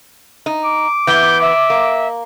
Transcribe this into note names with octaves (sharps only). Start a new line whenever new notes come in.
D#4
D6
E3 B3 G6
E5
A#3